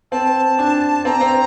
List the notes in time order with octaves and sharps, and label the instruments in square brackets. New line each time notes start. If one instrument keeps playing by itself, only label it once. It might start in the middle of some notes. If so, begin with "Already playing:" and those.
[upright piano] C4 [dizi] A5
[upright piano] D4
[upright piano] C4 [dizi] A#5
[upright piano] C4